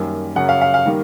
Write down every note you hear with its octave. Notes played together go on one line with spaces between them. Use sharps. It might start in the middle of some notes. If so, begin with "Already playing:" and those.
Already playing: F#2 D#3 G3 A#3
F#2 C#3 F#3 F#5
F5
F5
F5
D#3 G3 A#3